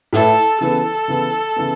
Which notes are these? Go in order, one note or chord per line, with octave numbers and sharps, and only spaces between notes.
A2 A3 E4 A4 B4 E5
C#3 E3 B3 A4
C#3 E3 B3
C#3 E3 B3